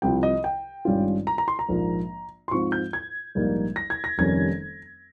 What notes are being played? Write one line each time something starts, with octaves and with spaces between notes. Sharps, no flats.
C2 C3 F3 G5
D#5
G5
G#1 G2 G3 C#4 F4
A#5
A#5
C6
A#5
A#1 G#2 F3 A#3
C6
G#2 F3 C4 F4 C#6
G6
G#6
A#1 G#2 G3 A#3 D#4
A#6
G#6
A#6
F1 F2 D#3 G3 C#4 G#6